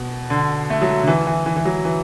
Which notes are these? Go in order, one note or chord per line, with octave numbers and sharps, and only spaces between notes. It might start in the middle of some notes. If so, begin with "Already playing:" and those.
Already playing: B2
D3
A3
F#3
D3
E3
E3
E3
E3
F#3
E3